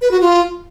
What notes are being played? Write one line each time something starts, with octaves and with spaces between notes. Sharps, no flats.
B4
F#4
F4